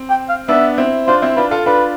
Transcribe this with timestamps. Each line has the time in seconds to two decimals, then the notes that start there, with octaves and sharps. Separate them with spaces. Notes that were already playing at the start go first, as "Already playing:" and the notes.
Already playing: C4
0.10 G5
0.29 F5
0.48 B3 D4 E5
0.78 C4 E4
1.07 D4 F4 C5
1.22 C4 E4
1.36 D4 F4 B4
1.51 F4 A4
1.66 D4 F4 B4